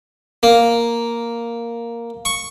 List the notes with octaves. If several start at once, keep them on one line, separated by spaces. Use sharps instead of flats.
A#3
C#6